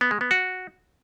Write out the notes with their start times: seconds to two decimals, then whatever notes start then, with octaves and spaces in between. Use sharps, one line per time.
0.01 B3
0.11 G#3
0.21 B3
0.31 F#4